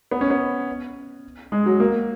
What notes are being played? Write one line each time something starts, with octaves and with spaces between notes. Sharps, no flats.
B3
C#4
B3
G#3
F#3
A#3